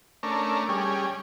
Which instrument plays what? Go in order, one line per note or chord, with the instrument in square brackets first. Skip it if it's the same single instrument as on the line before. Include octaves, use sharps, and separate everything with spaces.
[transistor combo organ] A3 C#4 D4 A#4
G3 C#4 G#4